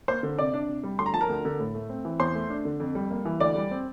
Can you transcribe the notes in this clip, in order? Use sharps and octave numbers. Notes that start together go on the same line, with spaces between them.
A#3 C5 C6
D3
C3 D5 D6
D4
C3
G3
D2 C6
A#5
F3 A5
A#4 A#5
D2
D3
A2
A3
C4
E3
E2 C5 C6
A3
D4
D3
F2
G3
A#3
E3
D2 D5 D6
G3
C4